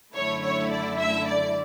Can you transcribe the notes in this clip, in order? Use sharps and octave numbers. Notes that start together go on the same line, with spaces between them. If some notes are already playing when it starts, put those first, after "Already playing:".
F#2 D3 A3 E4 C#5
C#5
D5
E5
D5